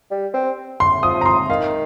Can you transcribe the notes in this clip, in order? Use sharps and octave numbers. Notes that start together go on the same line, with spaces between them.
G3
C4
C6
F3 D#6
A#5
C6
D#3 F5